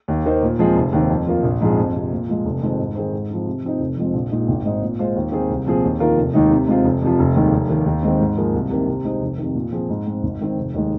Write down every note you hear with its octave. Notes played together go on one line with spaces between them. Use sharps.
D#2
D#3 A#3 D#4 C5
A#2
F3 G#3 C4 G#4
F1
D#2 D#3 C4
F2
F3 A#3 F4
A#1
G#2 F3 C4 G#4
F2
C3 F3
A#2
F3 G#3
F1
F2 D#3 G#3 C4
G#2
D#3 C4 G#4 C5
G#2
F3 C4
C3
F3 C4 D#4
F1
F2 F3 G#3 C4
A#1
A#2 G#3 D#4
G#1
G#2 G#3 D#4 C5
A#2
G#3 F4 C5
D#2
D#3 C4 G#4
C2
A#2 F3 C4 G#4
D#2
D#3 A#3 F4 A#4
F1
D#2 D#3 G#3 D#4
C3
G#3 C4 F4
F1
F2 C3 F3
F1
D#2 D#3 G#3
F1
D#2 D#3
D#2
D#3 G#3 C4
G#2
F3 A#3 G#4
C2
C3 D#3 A#3
C3
G#3 D#4 C5
F1
F2 C3 D#3
A#2
F3 C4 G#4
G#2
G#3 C4
G#1
G#2 D#3 C4
F1
D#2 D#3 G#3